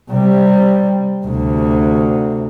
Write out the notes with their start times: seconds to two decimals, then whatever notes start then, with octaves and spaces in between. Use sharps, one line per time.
0.10 C3 G3
1.25 D2 C3